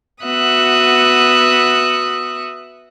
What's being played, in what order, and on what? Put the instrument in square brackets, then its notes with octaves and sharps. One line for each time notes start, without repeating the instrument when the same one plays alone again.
[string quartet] B3 F#4 E5 D#6 F#6